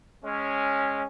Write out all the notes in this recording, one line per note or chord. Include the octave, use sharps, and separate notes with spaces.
G#3 C#4